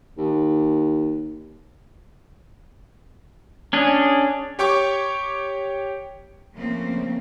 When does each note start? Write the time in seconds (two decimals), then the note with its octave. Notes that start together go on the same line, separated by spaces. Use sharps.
0.18 D#2
3.73 C#4 D4 G#4
4.59 G4 C#5 G5 C#6 D6
6.54 C#3 F3 A3 A#3 C4